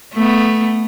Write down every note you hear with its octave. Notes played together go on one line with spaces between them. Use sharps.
A3 B3